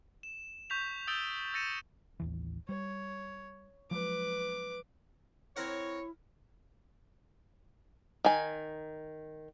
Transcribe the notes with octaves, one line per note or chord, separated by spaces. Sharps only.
E7
C#6 G6 B6 F7
D#6 E6 G6 A6 D7 G7
E6 A6 A#6 C#7 D#7 E7
A1 D#2 E3
G3 C#5
F3 F#3 G#3 B4 D6
C4 E4 A#4 C#5 F#5
D#3 G#5